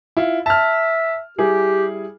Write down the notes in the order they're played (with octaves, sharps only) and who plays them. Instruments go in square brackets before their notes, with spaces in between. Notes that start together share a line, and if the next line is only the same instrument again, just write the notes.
[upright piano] E4 F4
[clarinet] E5 [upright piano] A5 F6
[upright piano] G3 E4 G#4 [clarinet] G4